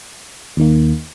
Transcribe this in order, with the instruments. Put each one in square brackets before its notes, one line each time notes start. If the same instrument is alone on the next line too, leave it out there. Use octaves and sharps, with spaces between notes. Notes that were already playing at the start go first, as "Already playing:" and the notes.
[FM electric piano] D#2 D#3 A#3